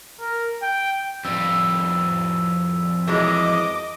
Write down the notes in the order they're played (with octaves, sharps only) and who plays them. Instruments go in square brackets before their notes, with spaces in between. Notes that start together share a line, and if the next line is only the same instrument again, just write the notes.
[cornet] A#4
G5
[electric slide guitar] F2 G3 [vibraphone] E6
[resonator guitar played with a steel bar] E3 F#3 G#3 [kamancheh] D#5 D6